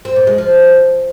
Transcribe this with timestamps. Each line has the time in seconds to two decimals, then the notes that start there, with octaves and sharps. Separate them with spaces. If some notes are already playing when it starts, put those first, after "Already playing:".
0.05 C4
0.16 A#2
0.27 G#3
0.38 F3